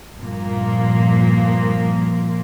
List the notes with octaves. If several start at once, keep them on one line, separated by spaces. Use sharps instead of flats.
G2 A#2 F3 A#3